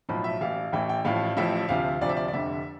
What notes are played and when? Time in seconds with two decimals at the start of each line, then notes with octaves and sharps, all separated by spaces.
0.09 B1 A2 F3 B5
0.24 E5
0.41 A1 A2 E3 F5
0.72 A1 A2 E3 G5
0.89 G5
1.05 A1 A2 F3 F5
1.37 A1 A2 F3 E5
1.69 D2 C3 F3 F5
2.01 D2 C3 F3 D5
2.09 E5
2.17 D5
2.28 D5
2.33 F1 F2 D3 E5